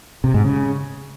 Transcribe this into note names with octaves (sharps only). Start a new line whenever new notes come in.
C3
G#2
C#3